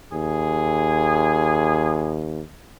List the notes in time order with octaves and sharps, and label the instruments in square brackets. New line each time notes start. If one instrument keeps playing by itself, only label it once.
[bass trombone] D#2 [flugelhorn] G#4